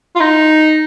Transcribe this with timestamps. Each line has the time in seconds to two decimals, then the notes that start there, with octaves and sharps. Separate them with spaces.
0.16 F4
0.20 D#4